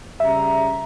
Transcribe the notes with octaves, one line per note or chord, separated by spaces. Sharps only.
C#3 G3 E5 A#5